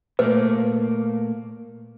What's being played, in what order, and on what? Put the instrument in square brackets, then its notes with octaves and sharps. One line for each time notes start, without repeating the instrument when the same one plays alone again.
[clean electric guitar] A#2 A3 A#3 [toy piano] B4